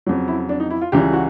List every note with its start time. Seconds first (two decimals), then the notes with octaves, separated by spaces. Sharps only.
0.06 F2 C#3 F#3
0.28 E4
0.49 D4
0.60 D#4
0.70 E4
0.81 F4
0.92 C#2 C#3 E3 G3 G4
1.13 F#4